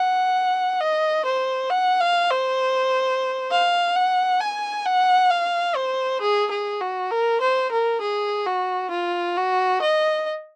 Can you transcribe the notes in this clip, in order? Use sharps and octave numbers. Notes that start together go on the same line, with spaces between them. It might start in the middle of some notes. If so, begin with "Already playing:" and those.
Already playing: F#5
D#5
C5
F#5
F5
C5
F5
F#5
G#5
F#5
F5
C5
G#4
G#4
F#4
A#4
C5
A#4
G#4
F#4
F4
F#4
D#5